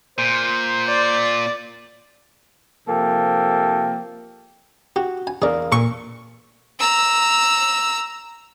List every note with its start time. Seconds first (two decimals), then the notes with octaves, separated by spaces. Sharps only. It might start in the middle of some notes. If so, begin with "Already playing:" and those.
0.18 A#2 C5
0.87 D5
2.87 C3 F3 A#3 A4 G5
4.96 F#4 G4
5.27 G#5
5.42 E2 G#4 A#4 D5 F5
5.72 A#2 A4 C#6
6.80 A#5 E6